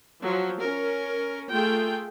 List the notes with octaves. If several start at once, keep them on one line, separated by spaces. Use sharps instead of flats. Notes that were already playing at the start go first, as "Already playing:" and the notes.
F3 F#3
C#4 A#4
A3 F4 G#4 G5